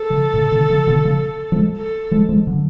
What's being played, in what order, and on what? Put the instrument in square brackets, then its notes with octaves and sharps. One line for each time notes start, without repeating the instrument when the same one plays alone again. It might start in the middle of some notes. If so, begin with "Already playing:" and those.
Already playing: [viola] A4
[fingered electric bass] C#3 F3
A2 C#3
B2 D3
C#3 F3
B2 D3
C#3 F3
F3 G#3
[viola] A4
[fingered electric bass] F3 G#3
F3 G#3
D3 F#3